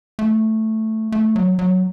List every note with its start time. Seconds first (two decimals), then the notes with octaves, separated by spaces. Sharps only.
0.19 A3
1.12 A3
1.36 F#3
1.59 F#3